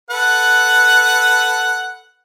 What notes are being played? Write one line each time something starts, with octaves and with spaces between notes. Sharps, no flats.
A4 B4 F#5